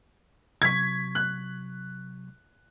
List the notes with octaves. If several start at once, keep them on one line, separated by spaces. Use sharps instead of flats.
C3 F#3 C#6 G#6 B6
F#6